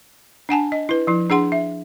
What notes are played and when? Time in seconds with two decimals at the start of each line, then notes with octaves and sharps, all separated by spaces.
0.49 D4 F#5 G#5 A5
0.72 D#5
0.89 E4 B4
1.07 F3 E4
1.30 D4 G#4 F#5 C6
1.52 E5